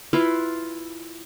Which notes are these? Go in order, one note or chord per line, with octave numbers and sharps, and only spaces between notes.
E4 F4 B4